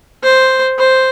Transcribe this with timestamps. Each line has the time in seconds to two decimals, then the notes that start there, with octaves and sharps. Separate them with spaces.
0.23 C5
0.78 C5